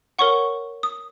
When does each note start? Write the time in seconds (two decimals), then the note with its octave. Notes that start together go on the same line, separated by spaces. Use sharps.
0.19 A#4 C#5 F#5 C#6
0.83 D#6